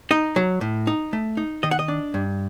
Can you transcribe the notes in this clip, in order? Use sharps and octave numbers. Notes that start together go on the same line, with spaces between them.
D#4 D#5
F#3
A2
D#4
A3
D#4
D#3 D#5
F#5
D#5
D4
G2